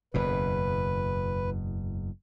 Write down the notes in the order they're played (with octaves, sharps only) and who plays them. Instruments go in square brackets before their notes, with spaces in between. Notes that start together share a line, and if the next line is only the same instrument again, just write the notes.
[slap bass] F#1 E2 B2 [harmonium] B4